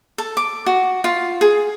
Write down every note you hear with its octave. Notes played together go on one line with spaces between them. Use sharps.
A4
D6
F#4
F4
G#4